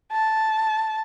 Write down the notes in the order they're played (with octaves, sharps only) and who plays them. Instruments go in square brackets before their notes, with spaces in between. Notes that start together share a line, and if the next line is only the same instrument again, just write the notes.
[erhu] A5